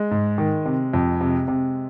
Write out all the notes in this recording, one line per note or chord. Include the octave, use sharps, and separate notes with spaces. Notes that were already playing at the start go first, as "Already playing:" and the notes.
Already playing: G#3
G#2
D#3
C3
F2
C3
C3